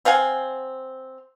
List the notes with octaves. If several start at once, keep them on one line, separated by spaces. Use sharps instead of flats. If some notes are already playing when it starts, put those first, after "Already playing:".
C4 F5 F#5 G#5